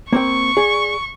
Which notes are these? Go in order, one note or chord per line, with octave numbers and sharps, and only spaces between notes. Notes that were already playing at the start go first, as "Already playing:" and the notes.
A#3 C4 G5 C#6
G#4 D5